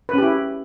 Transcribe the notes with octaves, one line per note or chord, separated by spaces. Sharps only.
C#4 E4 G4 B4